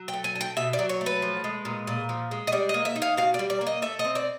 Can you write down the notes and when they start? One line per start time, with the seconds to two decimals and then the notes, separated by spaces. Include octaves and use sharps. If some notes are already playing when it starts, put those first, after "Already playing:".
Already playing: F#3
0.08 G5
0.13 A3
0.24 G#5
0.35 D4
0.41 G5
0.57 B2 E5
0.73 D5
0.79 F#3
0.89 C#5
1.01 A3
1.06 B4
1.22 F3
1.44 G#3
1.65 A#2
1.87 A#2
2.09 F3
2.31 G#3
2.47 D#5
2.52 G3 D5
2.69 D#5
2.74 A#3
2.85 E5
2.96 D#4
3.02 F5
3.17 B2 F5
3.34 D5
3.39 G3
3.50 D5
3.61 A#3
3.67 D#5
3.82 A3 E5
3.99 D#5
4.05 C4
4.15 D5